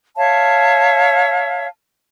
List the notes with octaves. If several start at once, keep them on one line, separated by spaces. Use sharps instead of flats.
C#5 E5 F5 A5